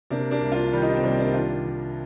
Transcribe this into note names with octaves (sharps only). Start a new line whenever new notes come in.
C3 A#3 D4
A#3 D4
C2
D4 F4
D#3 G3
D#4
D4
C4
C2 G3 A#3
A#3 D4
D#3 D4 F4
D#3